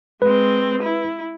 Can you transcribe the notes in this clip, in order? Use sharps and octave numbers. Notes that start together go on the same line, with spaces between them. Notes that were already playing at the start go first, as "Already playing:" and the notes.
G#3 C4 B4
E4